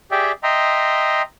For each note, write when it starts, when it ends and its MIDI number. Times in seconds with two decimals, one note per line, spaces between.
0.11 0.32 67
0.11 0.32 68
0.11 0.32 74
0.11 0.32 76
0.11 0.32 79
0.43 1.22 75
0.43 1.22 76
0.43 1.22 79
0.43 1.22 82
0.43 1.22 84